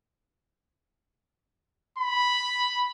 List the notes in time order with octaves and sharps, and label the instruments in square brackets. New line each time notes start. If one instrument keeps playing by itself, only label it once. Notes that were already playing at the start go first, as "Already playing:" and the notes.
[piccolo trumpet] B5